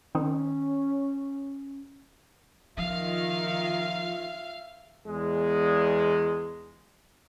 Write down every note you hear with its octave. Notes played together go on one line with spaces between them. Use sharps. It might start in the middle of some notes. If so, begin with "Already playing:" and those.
D#3 C4 C#4 D#4
D#3 F3 F4 E5 F5 F6
E2 G#3